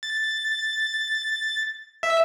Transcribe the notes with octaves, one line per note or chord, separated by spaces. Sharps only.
A6
E5